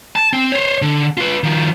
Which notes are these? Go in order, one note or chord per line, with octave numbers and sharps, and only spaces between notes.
A5
C4
C5 C#5
D3
F4 B4
D#3 F3